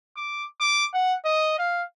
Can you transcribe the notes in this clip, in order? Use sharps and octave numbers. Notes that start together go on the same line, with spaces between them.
D6
D6
F#5
D#5
F5